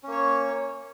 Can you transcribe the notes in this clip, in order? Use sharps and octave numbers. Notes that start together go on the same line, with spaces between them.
A#3 C#4 C#5